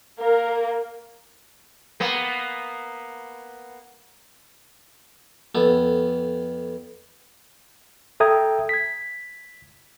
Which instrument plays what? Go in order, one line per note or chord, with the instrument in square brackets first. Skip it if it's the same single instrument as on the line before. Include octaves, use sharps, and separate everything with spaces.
[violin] A#3 [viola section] A#4
[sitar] A#3 B3
[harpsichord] F2 B3 A4
[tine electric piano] A4 E5 G5 A#5 D#6 G#6
G#6 B6